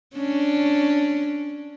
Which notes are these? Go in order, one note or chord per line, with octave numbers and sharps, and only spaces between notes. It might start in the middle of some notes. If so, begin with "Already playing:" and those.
C#4 D4